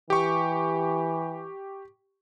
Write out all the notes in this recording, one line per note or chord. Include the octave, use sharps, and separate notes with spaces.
E3 G4 C#6